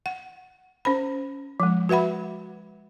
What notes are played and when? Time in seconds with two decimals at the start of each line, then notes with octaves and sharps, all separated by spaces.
0.06 F#5
0.85 C#4 C5 B5
1.60 F3 G#3
1.89 F#4 B4 E5 F#5 B5